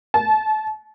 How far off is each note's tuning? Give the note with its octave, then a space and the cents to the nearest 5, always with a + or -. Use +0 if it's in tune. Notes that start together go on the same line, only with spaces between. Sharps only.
A5 -30